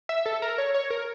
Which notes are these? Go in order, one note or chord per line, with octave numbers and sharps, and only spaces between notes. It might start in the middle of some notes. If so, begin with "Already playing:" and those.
E5
A4
A#4
C#5
C#5
A#4